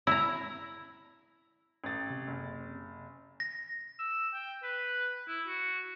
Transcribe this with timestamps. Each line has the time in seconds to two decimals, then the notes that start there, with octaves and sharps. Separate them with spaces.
0.07 E4 A#5
1.84 A1 A6
2.10 C3
2.27 F#1
3.40 A#6
3.99 E6
4.34 G5
4.63 B4
5.28 E4
5.47 F#4